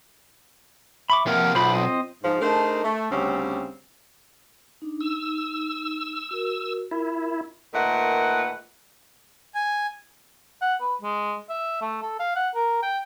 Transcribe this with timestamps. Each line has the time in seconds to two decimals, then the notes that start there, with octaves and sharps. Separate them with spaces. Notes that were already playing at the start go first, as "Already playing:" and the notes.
1.10 E5 B5 C#6 D6
1.27 C3 F3 A#3 F#5 F6
1.55 B1 F4 C5 B5
1.74 C4 F4 C5 D#5
2.24 G#2 F3
2.41 A3 D4 D#4 G#4 A#4 C5
2.83 A3
3.11 D2 C#3 G3 C4 C#4
4.82 D4 D#4
5.01 D#4 E6
6.31 F#4 A#4
6.91 E4 F4 A#4
7.74 A#2 D#3 A3 B4 F#5
9.55 G#5
10.61 F#5
10.80 B4
11.01 G#3
11.49 E5
11.81 A3
12.02 A4
12.19 F5
12.35 F#5
12.55 A#4
12.82 G5